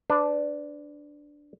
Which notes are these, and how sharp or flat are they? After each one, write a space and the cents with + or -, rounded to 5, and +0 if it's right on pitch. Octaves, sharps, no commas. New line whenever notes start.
D4 +0 B4 +40